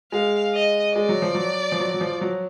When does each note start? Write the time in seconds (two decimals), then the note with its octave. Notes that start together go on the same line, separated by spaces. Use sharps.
0.12 G#3 F5
0.54 D#5
0.95 G#3 D5
1.09 F#3
1.22 F3
1.35 F#3
1.72 F3
1.80 F#3
1.94 F#3
2.01 F3
2.21 F#3